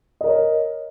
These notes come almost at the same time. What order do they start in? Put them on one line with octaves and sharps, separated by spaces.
D#5 A#4 C#5